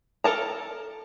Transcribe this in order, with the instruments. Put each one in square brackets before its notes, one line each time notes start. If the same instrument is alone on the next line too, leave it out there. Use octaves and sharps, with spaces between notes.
[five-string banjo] A4 A#4 A5 A#5